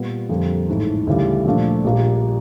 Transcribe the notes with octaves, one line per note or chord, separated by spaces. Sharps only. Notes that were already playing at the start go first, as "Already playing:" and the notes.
Already playing: A#2 G3 B3
F2 D3 G3 A#3
A1 G#2 E3 A3
D2 C#3 E3 G3
A#2 F3 A3 D4 F4
A#1 A#2 G3 A#3